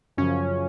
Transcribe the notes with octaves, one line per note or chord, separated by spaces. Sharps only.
F#2 C#3 F3 C#4